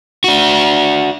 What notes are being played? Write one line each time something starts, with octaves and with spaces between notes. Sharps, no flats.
D4 F#4